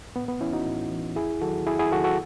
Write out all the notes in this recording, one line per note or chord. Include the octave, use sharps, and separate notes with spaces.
A2 B3
B3
E3 C#4 E4
D#4 F#4
A2
E3
E2 E4 G#4
D#3 F#3 F#4 A4
E2 E4 G#4
E4 G#4
D#3 F#3 F#4 A4
F#4 A4